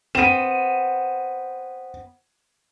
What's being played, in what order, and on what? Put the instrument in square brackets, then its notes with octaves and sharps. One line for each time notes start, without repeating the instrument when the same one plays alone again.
[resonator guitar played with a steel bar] B3 C4 [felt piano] D#7 E7